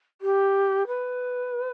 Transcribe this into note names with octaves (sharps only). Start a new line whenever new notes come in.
G4
B4